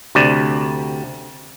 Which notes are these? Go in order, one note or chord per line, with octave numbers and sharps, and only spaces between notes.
D2 C3 D5